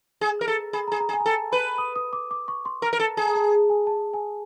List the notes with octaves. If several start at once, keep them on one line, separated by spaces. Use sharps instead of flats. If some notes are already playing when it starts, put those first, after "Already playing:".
G#4
A#4
A4
G#4 B5
A#5
G#4
A#5
G#4
G#5
A#5
A4 A5
B4 B5
D#6
D#6
D6
D6
C#6
C6
A#4 A#5
A#4
A4 A5
G#4 A5
A#5
A5
G#5
A5
G#5